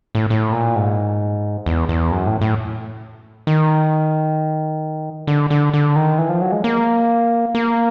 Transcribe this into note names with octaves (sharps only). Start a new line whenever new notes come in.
A2
A2
A#2
G#2
E2
E2
F#2
A2
A2
D#3
D3
D3
D3
D#3
E3
F3
F#3
G#3
A#3
A#3